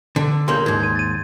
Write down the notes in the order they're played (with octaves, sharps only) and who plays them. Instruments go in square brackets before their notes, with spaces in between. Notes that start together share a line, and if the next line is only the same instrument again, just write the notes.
[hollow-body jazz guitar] D3
[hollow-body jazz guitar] C#2 A#3 [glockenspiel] C6 G6
[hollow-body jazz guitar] D#2 G#2 [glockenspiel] G#6
[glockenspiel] G#6 D#7
A6 D#7